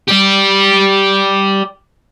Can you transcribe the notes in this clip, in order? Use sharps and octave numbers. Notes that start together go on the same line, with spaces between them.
G4 D5